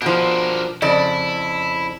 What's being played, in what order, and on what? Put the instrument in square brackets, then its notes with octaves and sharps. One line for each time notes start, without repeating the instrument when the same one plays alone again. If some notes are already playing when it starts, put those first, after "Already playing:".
[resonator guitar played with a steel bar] B2 F3 [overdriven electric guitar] D4 A#4
[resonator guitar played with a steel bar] F2 C#3 D5 [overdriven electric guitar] E4